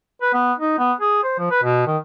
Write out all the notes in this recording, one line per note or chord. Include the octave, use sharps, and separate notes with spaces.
B4
B3
D#4
B3
G#4
C5
F3
B4
B2
D#3